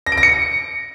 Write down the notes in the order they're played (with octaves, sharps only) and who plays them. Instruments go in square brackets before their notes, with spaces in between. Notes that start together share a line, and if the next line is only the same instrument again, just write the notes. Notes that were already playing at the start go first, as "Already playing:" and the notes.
[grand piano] A#6
D7
A#6
C#7